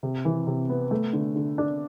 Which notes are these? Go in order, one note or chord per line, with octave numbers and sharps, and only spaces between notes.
C3
E3
C3
B3
A3
D3
D3
D4